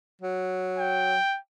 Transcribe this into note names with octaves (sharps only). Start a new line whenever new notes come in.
F#3
G5